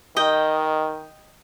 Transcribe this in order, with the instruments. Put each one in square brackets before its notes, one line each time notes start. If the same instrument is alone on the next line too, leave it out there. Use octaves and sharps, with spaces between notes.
[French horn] D#3 [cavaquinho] D#5 G5